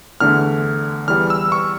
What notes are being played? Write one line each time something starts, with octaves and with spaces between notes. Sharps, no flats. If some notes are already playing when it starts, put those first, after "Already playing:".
E2 D3 A3 F6
E2 E3 G3 F6
E6
C#6